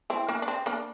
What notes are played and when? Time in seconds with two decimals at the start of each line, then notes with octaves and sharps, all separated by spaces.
0.10 C4 E4
0.29 A#3 D4
0.42 D4
0.48 C4
0.66 A#3 D4